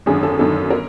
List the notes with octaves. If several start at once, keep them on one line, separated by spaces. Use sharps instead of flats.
G#1 F#2 D3 G#4
A4
G1 F#2 D#3 A4
A#4